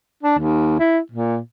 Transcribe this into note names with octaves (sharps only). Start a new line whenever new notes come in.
D4
D#2
E4
A#2